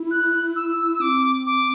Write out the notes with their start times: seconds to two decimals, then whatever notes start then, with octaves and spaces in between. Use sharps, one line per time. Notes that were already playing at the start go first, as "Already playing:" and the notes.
Already playing: E4
0.11 F#6
0.56 E6
0.93 E6
1.01 C4 D6
1.47 D6